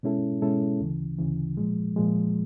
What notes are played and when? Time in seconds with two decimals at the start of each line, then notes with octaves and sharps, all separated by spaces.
0.03 B2 G#3 C#4 E4 A4
0.42 B2 G#3 C#4 E4 A4
0.80 D2 C#3 E3
1.19 D2 C#3 E3
1.58 A#2 F3 G#3
1.96 A#2 F3 G#3